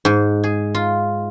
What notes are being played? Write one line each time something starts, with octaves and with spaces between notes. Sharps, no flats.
G#2
G#4
F4